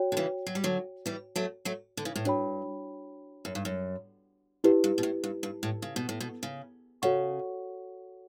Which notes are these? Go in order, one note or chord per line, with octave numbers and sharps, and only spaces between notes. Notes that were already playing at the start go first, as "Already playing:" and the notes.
Already playing: F#4 C#5 G5
D3
C#3 E3
F#3
G3
D3 F#3
E3 G3
F#3 A3
F#3 A3
D3
C#3 E3
A2
G2 D4 F#4 C#5 G5 B5
F#2
G2
F#2
F#2 E4 G4 B4
G2
B2
A2
G2
G2
A2
C#3
B2
A2
B2
C#3
C#3 F#4 A4 C#5 F#5 C#6